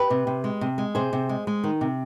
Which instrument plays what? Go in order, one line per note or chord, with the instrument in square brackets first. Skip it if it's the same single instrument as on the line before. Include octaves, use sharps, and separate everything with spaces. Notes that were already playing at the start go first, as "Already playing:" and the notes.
Already playing: [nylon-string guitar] G4 B4
C3
C3
G#3
C3
G#3
C3 G#4 C5
C3
G#3
G#3
D#3
C3